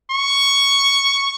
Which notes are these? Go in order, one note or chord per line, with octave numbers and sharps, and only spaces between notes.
C#6